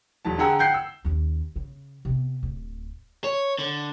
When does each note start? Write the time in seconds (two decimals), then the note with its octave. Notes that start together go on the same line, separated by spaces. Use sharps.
0.25 E1 F#3 A5
0.38 D3 G4 G#4 F#5 A#5 E6
0.59 F#5 G5 G6 C7
0.74 E6
1.04 D#2 C#4
1.56 C#3
2.05 C3 B3
2.43 D1
3.24 C#5
3.59 D3